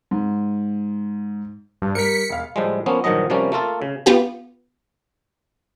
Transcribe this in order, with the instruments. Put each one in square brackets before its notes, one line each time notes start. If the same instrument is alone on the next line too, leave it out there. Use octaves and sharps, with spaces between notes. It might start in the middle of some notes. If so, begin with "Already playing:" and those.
[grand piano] G#2
[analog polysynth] G2
[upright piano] G3 A#4 [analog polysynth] B6 C#7
[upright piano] E1 F5
[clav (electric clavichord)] A2 F3 G3 G#3
F3 A#3 B3 C#4
G2 A#2 D#3 F3 F#3 D#5
C3 F3 G3 A#3 C#4
A3 A#3 F4 A4
C#3
[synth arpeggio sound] B3 F4 G4